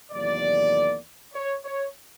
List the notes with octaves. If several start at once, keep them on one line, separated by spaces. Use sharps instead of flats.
E2 C3 D#3 F#3 A#3 D5
C#5
C#5